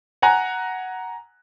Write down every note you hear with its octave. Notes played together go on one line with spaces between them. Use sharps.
F#5 G#5 A#5 F#6